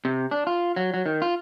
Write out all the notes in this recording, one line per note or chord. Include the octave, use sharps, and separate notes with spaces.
C3
D4
F4
F#3
F#3
D#3
F4